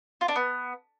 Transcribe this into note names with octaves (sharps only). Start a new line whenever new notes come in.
F4
D4
B3